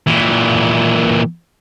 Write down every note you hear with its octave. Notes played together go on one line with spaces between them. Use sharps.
A#2 E3